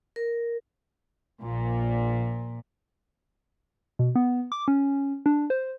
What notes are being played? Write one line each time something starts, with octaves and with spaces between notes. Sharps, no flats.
A#4
A#1 A#2
B2
B3
D6
C#4
D4
C5